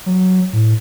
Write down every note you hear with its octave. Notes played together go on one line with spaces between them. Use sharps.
F#3
A2